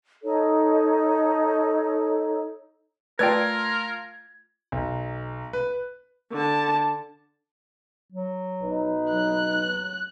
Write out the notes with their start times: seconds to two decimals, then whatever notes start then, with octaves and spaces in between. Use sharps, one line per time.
0.23 D#4 A4 C#5
3.19 A3 F4 A#4 B4 D5 G5 G#6 A#6
4.72 B1
5.53 B4
6.32 D3 A5
8.13 F#3
8.63 B1 D#4 B4
9.11 F#3 F#6